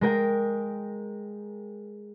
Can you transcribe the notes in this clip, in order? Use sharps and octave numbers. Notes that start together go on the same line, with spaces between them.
G#3 A#4 G5